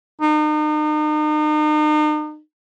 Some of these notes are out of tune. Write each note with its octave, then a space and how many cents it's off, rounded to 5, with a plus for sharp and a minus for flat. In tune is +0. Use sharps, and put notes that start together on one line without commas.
D#4 -40